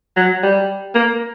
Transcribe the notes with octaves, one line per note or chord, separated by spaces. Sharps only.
F#3
G3
A#3